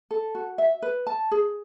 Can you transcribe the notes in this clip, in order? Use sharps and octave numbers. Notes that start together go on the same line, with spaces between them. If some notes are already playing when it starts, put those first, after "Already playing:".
A4
F#4
E5
B4
A5
G#4